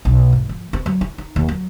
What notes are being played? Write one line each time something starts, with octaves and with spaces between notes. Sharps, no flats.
B1
G#1
F3
C4
F#3
E4
D#4
D#2
F#3